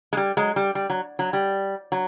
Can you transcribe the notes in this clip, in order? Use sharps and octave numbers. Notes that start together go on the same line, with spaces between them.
G#3
G3
F#3 G#3
G3
G3
F#3
F#3
G3
F#3